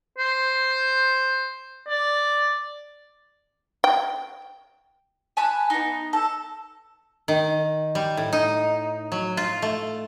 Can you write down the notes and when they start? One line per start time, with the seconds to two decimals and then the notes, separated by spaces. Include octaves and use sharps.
0.19 C5
1.88 D5
3.84 G5
5.37 G#5 A5 B5 F#6
5.70 B3 D#4
6.13 A4
7.28 D#3
7.95 G3
8.17 A2
8.33 D#4
9.12 F#3
9.37 F4
9.62 A3